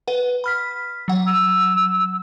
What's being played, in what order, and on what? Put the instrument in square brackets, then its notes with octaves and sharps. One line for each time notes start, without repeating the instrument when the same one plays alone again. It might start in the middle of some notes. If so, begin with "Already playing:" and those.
[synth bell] B4 F#5
B5 F6 B6
F#3 F#5
[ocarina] E6